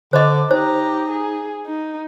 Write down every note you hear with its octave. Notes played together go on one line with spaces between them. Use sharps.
D3 C5 D#5 D6
D#4 G4 C5 A#5
G#4
D#4